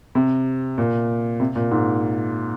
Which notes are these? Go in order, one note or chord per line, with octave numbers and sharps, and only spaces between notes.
C3
A#2
C3
A#2
G#2